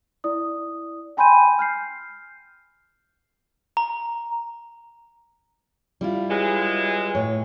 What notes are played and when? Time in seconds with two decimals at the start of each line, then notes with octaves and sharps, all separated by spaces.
0.24 E4 D5 D#6
1.17 G5 G#5 B5 C6 G6 D#7
1.59 F6 G6 C7
3.77 A#5
6.01 G3 E4 F4
6.28 E3 F#3 G#3
7.15 A2 C#5